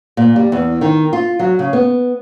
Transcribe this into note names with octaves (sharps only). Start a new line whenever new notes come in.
A#2
G3
E2
D#3
F4
F#3
C#3
B3